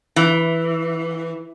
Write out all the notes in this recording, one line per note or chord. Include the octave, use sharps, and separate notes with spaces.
E3